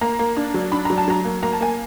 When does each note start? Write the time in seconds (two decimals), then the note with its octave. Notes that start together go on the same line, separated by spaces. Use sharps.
0.01 A#3 A#5
0.19 A#3
0.37 D4
0.54 F#3
0.72 D4 B5
0.85 F#3 A#5
0.98 A5
1.08 F#3 A#5
1.25 A#3
1.43 A#3 A#5
1.53 A5
1.61 A#3 G#5